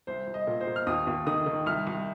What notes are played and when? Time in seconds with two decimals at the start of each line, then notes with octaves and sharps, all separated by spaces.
0.07 C2 C5
0.27 C2
0.34 D#5
0.47 A#2
0.61 C5
0.67 A#2
0.76 F6
0.87 D#2 D#6
1.07 D#2
1.27 D#3 D#6
1.46 D#3
1.66 C2 F6
1.87 C2